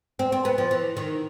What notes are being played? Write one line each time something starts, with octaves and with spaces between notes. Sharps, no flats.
C4
C4
B3
F3
E3
D#3